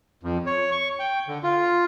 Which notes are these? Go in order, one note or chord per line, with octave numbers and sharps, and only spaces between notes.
F2
C#5
C#6
G5
D3
F4